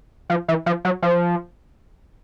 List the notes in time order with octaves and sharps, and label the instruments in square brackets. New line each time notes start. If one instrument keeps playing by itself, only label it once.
[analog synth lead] F3
E3
F3
F#3
F3